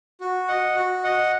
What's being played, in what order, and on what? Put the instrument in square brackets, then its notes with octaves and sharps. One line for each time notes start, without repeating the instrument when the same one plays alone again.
[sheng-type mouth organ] F#4
D#5 F#5
F#4
D#5 F#5